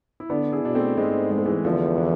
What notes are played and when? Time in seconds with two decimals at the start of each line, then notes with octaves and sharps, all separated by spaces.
0.20 E4
0.30 D3 B3 D4
0.52 E4 G#4
0.64 B2 D4
0.75 A3 C4
0.97 G#2 G#3 B3
1.31 G#3
1.38 A3
1.45 E3 G#3
1.65 E2 D3 F3
1.98 E3